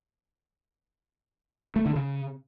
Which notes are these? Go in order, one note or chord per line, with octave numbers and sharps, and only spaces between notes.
A3
D3
C#3